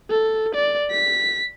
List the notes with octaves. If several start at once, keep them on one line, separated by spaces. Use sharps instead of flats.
A4
D5
B6